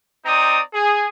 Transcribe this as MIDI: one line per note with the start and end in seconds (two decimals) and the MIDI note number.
0.25 0.60 60
0.25 0.60 63
0.25 0.60 74
0.25 0.60 82
0.25 0.60 87
0.74 1.07 68